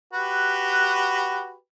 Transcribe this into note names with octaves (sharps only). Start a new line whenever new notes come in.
F#4 G4 B4